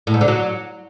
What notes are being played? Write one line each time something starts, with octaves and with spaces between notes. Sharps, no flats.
A2
G#2
D3
F#3